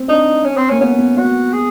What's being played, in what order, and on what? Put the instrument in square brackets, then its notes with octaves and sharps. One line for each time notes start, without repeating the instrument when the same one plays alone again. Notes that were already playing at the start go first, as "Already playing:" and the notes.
Already playing: [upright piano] C4
[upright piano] D4 [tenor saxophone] D#4
[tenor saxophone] C#4
C4
[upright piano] A#3 [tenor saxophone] C#4
[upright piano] B3 [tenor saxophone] C#4
[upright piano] B3
[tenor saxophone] F#4
G#4